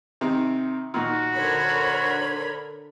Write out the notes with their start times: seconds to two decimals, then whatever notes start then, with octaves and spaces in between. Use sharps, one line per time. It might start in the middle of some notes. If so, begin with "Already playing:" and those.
0.21 C3 D#3
0.94 A#2 D#3 F#4
1.35 D3 A#4 C5 C#5 B5 G#6